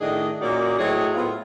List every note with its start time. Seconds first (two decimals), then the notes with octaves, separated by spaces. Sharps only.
0.01 A2 D#3 D4 G#4 D#5
0.41 A#2 A#3 C#4 D#4 F#4 D5
0.79 A2 F#3 C4 G#4 C#5 D#5
1.14 A2 B3 C4 F4